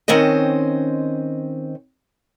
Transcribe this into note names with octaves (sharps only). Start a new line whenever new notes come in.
D#3 C4 C#4 C5 D#5